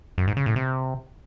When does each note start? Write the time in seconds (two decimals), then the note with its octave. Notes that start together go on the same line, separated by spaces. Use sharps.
0.18 F#2
0.27 G#2
0.37 C#3
0.46 A2
0.56 C3